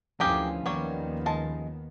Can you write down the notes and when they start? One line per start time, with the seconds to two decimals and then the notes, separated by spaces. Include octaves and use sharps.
0.20 D2 E3 F3 C#4 F4 G4 G#4 A#4
0.66 D#2 D#3 F#3 G3 B3 C#5
1.26 G#3 A5